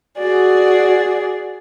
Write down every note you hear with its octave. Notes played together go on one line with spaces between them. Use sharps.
F#4 G#4 D5